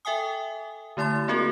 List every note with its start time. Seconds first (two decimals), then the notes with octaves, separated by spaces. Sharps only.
0.05 A4 E5 G5 G#5 D#6
0.97 D3 A3 E4 C6 A6
1.28 A#3 C4 F#4 G#4 A#4